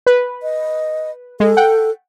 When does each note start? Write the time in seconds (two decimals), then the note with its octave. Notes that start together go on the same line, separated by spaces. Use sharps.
0.06 B4
0.42 D#5
1.40 G#3 A4
1.57 F#5 G5